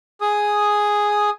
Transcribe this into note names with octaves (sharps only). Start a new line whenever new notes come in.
G#4 D#6